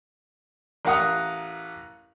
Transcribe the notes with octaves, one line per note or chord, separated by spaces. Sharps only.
A1 A#4 F5 F#5 D#6